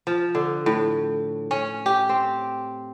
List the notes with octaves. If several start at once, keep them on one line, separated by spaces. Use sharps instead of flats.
F3
D3
A2
C#4
G4
C4